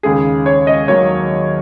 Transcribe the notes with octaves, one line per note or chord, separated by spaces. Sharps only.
D#2 C#3 G#3 G#4
C#5
D#5
D#2 D#3 F#3 A#3 C#5